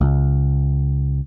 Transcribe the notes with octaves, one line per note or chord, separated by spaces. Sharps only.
C#2